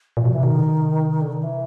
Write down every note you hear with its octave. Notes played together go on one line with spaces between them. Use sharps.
A#2 E3
B2 F3
C3 E3
B2 D#3
C3
C#3
C3
D3
D#3
E3